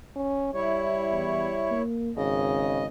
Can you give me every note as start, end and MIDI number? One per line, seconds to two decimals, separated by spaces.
0.16 0.53 61
0.54 1.75 55
0.54 1.82 64
0.54 1.82 73
1.12 1.50 40
1.71 2.11 58
2.17 2.86 32
2.17 2.85 49
2.17 2.86 75